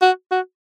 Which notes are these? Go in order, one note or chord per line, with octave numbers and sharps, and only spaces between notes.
F#4
F#4